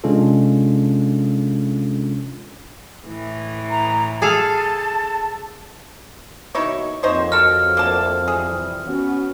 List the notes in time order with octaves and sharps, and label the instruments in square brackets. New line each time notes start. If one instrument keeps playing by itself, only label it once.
[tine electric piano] C3 G#3 C#4 D4 F4 A4
[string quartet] A2 E3
[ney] A#5
[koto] G#4 A4 F5 [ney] A5
[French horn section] D#2 B2 [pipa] D#4 E4 C#5
[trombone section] F2 [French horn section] A#2 C4 [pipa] D#4 C5 C#5
[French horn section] F#4 C#5 D#5 [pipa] A4 A#4 [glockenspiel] F6
[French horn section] D2 [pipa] A#3 A5
[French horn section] C3 E3 G3 [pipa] G#4
[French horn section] B3 F#4 [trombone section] C#4